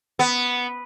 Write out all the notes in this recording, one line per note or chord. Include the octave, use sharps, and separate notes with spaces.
B3